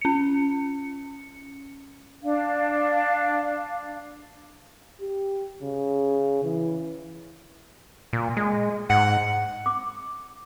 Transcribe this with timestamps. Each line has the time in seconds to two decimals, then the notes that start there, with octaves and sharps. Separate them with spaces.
0.01 C#4 C#7
2.21 D4 F5
5.01 G4
5.62 C#3
6.43 E3
8.13 A#2
8.37 G#3
8.90 G#2 F#5
9.66 D6